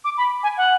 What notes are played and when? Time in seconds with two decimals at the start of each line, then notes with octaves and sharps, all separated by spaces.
0.04 D6
0.18 B5
0.43 G#5
0.57 F#5